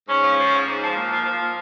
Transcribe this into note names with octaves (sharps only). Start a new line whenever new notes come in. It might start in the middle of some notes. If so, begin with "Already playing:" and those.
G#2 C#4
F3
F3
G#2
G#2
F3
A#2
F3
F3
A#2